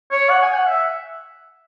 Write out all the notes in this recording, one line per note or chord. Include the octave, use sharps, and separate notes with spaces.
C#5
F#5
G#5
F#5
E5